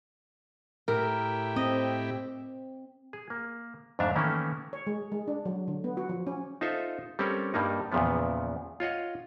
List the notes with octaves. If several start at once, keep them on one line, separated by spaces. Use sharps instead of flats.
A2 E4 G4 A#4
C4 D#5
G#4
A#3
F2 G#2 A3 D4 E5 F5
D#3 E3 A3 A#3 C#4 E4
C#5
G#3
G#3
D4
F#3
D3
B3
F#4
F3
C#4
D#4 F4 A4 C5 E5
G3 C4 C#4 A4 A#4
G2 G3 A#3 D#4
E2 A#2 C#3 F3 B3
F4 C#5 D#5 F#5